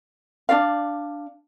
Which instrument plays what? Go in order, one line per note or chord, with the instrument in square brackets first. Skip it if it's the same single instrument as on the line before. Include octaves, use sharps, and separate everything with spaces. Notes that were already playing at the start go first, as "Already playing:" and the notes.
[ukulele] D4 F#4 D5 F5